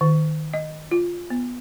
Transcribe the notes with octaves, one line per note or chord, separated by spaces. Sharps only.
D#3
D#5
F4
B3